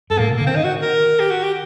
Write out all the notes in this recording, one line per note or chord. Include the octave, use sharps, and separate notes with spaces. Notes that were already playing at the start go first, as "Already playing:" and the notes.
G2 A4
A2 A#3
C3
D3 A#3
D#3 C4
D#4
F#4
A#4
G4
F#4
G4